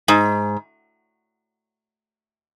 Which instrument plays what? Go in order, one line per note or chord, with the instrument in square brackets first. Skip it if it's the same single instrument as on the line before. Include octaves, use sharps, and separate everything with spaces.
[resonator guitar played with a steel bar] G#2